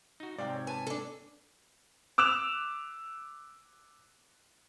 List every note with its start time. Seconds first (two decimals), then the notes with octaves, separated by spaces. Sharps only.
0.20 D#4 F#4
0.38 G#2 C3 D5 F5 G5
0.50 C#5 G5
0.67 B4 G#5 A5
0.87 D4 A4
2.18 D6 E6 F#6 E7 F7